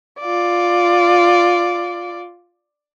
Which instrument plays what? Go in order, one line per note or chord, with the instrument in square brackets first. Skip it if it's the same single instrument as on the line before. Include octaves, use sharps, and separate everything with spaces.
[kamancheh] F4 D5